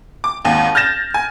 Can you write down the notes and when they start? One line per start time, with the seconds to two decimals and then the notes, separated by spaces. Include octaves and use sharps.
0.24 D6
0.45 G#1 D#2
0.75 F6 G6 A6 A#6 E7
1.14 G#5